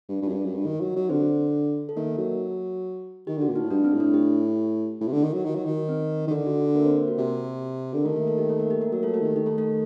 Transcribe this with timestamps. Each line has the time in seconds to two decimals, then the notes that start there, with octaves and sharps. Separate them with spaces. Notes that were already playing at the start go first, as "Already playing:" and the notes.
0.09 G2
0.22 G2
0.28 F#2
0.33 G2
0.45 F#2
0.55 G2
0.66 D#3
0.81 F#3
0.95 F#3
1.09 D3 C4 C5
1.89 A4
1.96 D#3 A#3 A#4
2.18 F#3
3.27 D#3 G4
3.37 D3 F#4
3.48 A#2
3.56 D#4
3.60 A2
3.70 G2 D4
3.84 C4
3.93 A2
4.00 D4
4.14 G4
5.01 A2
5.08 C3
5.12 D3
5.23 D#3
5.33 F#3
5.45 D#3
5.55 F#3
5.65 D#3
5.89 C4
6.28 D#3
6.31 D3 D4
6.46 F#4
6.75 A#3 A#4
6.85 C4 C5
6.96 A#3 A#4
7.08 F#4
7.18 C3 G4
7.93 D3 A#4
8.05 D#3 A3 A4
8.16 A#3 A#4
8.27 A3 A4
8.38 G4
8.49 A3 A4
8.60 A#3 A#4
8.71 G4
8.81 A#3 A#4
8.92 F#3 A#3 A#4
9.03 A3 A4
9.06 F#3
9.14 A3 A4
9.21 D#3 G4
9.36 D#3 G4
9.46 A3 A4
9.58 A3 A4